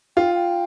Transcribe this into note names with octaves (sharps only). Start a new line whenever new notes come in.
F4 G5
G5